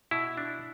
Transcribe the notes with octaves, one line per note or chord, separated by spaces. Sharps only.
B2 E4
D4